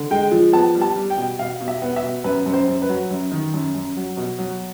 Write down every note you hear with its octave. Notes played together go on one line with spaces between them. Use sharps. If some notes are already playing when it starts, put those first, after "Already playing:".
Already playing: D3
G#3 G5
F3
B3 A5
G3
A5
G3
G5
B2
B2 F5
B2
E5
B3
E5
B2
F#2 B4
F#2
C5
F#2
B4
F#3
F#2
D#3
F#2
F#2
F#3
B2
F#3